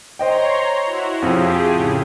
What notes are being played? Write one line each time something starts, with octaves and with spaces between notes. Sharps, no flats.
C5 C#5 D#5 G5 A#5 C6
E4 F#4
F2 F3 G4 G#4
A2 C#3